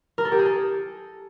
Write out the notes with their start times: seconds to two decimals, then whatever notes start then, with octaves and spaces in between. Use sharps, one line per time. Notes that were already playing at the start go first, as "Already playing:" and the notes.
0.18 A#4
0.25 A4
0.32 G4
0.39 G#4
0.46 A4